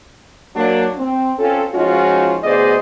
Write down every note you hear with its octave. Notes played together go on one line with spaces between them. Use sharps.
F#3 A#3 D4
C4
C4 C#4 F4 A4
F3 G#3 C#4 D#4 F4 F#4
D2 B3 G#4 C5 D5 D#5